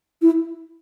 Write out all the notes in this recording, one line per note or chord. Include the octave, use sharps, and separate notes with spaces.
E4